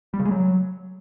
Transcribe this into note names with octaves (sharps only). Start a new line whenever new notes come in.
G3
C#3
G#3
F#3